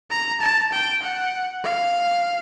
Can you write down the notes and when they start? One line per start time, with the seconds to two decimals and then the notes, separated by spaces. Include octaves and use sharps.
0.11 A#5
0.41 A5
0.72 G5
1.02 F#5
1.63 F5